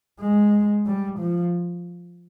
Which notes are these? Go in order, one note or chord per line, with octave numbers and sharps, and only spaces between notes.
G#3
G3
F3